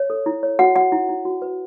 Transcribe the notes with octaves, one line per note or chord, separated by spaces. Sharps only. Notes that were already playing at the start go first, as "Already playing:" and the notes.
Already playing: C#5
A4
E4
C#5
F#4 F#5
F#4 F#5
E4
E4
F#4
B4